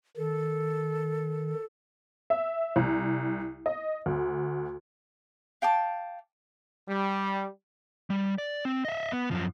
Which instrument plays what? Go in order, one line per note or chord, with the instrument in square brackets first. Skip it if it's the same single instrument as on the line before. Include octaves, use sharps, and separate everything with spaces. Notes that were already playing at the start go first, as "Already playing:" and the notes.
[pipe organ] D#3 [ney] A4
[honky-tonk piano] E5
C2
D#5
D2
[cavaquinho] F5 G5 A5 D6
[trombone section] G3
[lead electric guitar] G3
D5
C4
D#5 E5
B3
F#2 F3